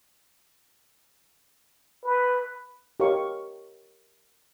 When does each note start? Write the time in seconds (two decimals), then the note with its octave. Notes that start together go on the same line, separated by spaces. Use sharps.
2.04 B4
3.00 G4 A#4 C#5 D#5 F5 C#6